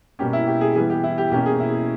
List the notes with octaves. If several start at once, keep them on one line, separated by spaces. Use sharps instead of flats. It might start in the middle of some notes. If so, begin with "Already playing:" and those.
B2 G3 A#3 C#4 G4
E4
G4
G#4
E3 G3 B3 G#4
G4
E4
G4
B2 A#3 C#4 G4
G#4
E4